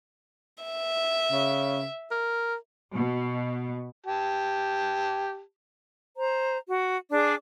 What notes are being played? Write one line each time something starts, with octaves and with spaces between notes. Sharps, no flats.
E5
C#3
A#4
B2
G4 A5
C5 A#5
F#4
D4 G#4 D5 D6